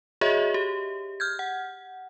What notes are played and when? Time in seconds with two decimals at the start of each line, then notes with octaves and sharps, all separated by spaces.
0.21 F#4 G#4 C#5 D#5 E5
0.54 G4
1.20 F6 G6 G#6
1.39 F#5